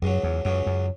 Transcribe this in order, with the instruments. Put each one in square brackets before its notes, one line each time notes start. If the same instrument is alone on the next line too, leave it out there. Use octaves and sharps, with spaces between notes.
[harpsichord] C#2 C#3 F#3 [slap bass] F#2
[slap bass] E2
[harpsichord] C#2 C#3 F#3 [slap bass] F#2
[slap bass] F#2